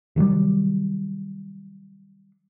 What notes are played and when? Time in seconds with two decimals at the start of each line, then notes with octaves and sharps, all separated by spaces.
0.16 C3 D#3 F#3 G3